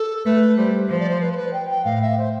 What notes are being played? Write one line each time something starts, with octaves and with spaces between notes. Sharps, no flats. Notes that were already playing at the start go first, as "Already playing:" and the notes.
Already playing: A4
A3 B4
G3 C5
F3 C5
D5
C5
B4
C5
B4
G5
G5
A2 F5
E5
C5